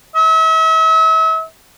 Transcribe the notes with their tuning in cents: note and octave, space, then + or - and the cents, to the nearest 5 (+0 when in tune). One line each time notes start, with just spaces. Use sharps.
E5 -40